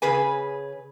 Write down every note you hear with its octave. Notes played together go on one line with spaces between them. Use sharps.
C#3 G#4 B4 G#5